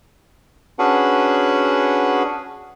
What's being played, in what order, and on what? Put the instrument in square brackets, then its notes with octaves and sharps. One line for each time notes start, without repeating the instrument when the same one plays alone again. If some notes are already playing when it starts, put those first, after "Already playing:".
[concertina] C#4 D4 F#4 G#4 B4 F#5